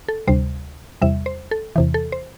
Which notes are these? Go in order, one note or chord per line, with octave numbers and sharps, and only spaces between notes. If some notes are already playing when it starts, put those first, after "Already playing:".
A4
D2 C3 G3 C5
E2 C3 G3 E5
C5
A4
E2 C3 E3
A4
C5